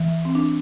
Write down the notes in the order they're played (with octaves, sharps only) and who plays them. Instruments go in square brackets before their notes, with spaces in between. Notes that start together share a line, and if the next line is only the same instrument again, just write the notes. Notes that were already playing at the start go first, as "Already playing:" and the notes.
Already playing: [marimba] E3
C4
D4